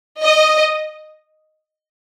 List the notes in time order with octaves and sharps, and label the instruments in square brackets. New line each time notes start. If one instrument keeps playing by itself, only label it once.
[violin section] D#5